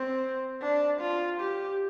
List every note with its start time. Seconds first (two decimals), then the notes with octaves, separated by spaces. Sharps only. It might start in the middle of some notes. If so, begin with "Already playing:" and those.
Already playing: C4
0.62 D4
1.01 F4
1.41 G4